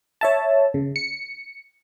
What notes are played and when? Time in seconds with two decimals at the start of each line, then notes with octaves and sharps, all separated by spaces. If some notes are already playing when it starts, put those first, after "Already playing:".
0.21 C#5 E5 A5
0.74 C#3
0.96 C#7